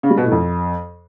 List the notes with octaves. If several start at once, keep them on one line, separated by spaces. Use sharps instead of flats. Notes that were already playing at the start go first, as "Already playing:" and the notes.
C#3
G3
B2
A2
F2